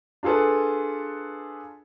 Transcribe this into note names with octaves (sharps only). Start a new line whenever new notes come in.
D4 F4 G#4 A4 B4